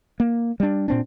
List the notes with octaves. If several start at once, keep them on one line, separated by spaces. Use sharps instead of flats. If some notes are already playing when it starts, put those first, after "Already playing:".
A#3
G3 D4
A#2 C4 D4